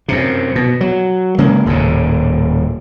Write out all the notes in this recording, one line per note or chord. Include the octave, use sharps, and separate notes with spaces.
F#2 C3
B2
F#3
C#3 G#3 A#3
D#1 D#2 A2 C#3